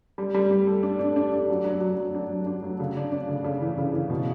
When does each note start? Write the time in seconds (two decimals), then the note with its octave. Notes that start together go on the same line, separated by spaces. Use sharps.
0.18 G3
0.34 G3
0.51 G3
0.67 A4
0.83 D4
0.99 D4
1.16 D4
1.32 D4
1.49 F#3
1.65 F#3
1.81 F#3
1.97 F#3
2.15 D4
2.30 F#3
2.47 D4
2.63 F#3
2.80 C#3
2.96 D4
3.12 D4
3.29 C#3
3.44 C#3
3.61 E3
3.78 C#3
3.93 E3
4.10 B2